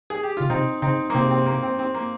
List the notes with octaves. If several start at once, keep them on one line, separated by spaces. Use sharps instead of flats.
G#4
G4
C#3 F4
C3 C4 D#4
C#3 C4 D#4
A#3
C3 C4
C4
A#3
C4
C4
A#3